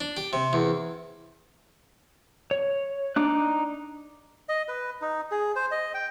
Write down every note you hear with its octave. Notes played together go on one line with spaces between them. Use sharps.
D4
G4
C3
E2
C#5
D4 D#4 D6 F#6
D#5
B4
D#4
G#4
C5
D#5
G5